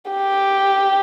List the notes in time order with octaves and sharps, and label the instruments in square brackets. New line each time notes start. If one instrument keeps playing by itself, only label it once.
[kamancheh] G4